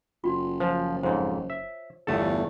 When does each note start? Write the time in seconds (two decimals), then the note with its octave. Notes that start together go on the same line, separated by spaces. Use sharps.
0.24 F#1 F4 F#4
0.60 F3 C5 G#5
1.03 F2 G#2 C5 C#5
1.50 E5
2.07 G1 E2 A3 A4